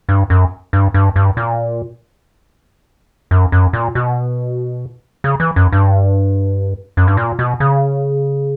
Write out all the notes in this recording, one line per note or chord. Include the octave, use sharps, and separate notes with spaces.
G2
F#2
G2
G2
G2
A#2
F#2
F#2
A#2
B2
C#3
E3
F#2
G2
F#2
G2
A#2
B2
C#3